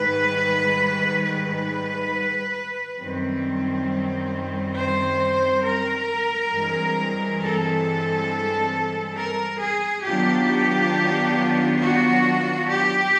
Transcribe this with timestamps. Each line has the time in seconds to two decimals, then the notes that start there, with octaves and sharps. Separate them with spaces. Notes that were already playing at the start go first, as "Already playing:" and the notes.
Already playing: G#2 D#3 G3 B4
1.22 B4
2.99 F#2 D#3 G3 C4
4.76 C5
5.64 A#4
6.52 G2 E3 G#3 C4
7.41 A4
9.17 A#4
9.61 G#4
10.05 D#3 F#3 B3 D4 F4 G4
11.82 F#4
12.70 G4